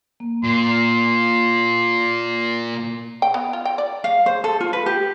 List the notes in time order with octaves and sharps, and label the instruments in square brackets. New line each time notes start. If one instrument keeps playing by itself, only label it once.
[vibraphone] A#3
[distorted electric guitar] A#2 [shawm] C6
[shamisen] G5
B3
F4
G5
D5
[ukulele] F5
C5
A4
F4
B4
G4